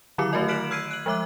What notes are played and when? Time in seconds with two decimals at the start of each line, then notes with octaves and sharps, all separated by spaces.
0.18 D3 D#3 F#3 E4 D6 C#7
0.33 A3 F#4 A#4 D#5
0.48 F6 F#6 B6 D7 E7 F#7
0.71 E6 F6 G#6 C7 D7 D#7
0.91 F#6 F#7
1.06 F3 G#3 E5 D6 F#6